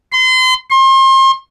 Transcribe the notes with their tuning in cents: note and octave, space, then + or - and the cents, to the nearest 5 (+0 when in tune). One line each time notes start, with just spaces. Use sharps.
C6 -35
C6 +35